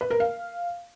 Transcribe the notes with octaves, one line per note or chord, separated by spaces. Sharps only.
B4
A#4
F5